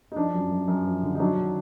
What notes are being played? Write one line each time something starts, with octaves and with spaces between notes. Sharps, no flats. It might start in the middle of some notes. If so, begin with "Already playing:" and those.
D#4
F3 D4
F#2
F#2
F#2
F3
D3
D#4
F#3 D4
D#3